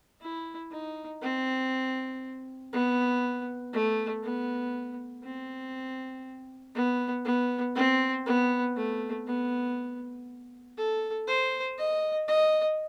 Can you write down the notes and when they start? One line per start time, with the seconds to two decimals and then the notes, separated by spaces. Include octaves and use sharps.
0.21 E4
0.71 D#4
1.22 C4
2.73 B3
3.73 A3
4.23 B3
5.24 C4
6.75 B3
7.25 B3
7.75 C4
8.26 B3
8.76 A3
9.27 B3
10.77 A4
11.27 C5
11.78 D#5
12.28 D#5